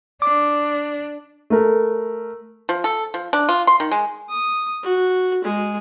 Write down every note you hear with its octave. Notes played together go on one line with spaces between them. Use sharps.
D4 D6
A3 A#4
F3
A4
F3
D4
F4
C6
D#3
G#3
D#6
F#4
G#3